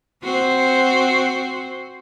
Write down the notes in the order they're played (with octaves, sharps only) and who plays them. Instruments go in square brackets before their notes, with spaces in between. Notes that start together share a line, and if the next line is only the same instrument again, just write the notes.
[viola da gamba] C4 F#4 C5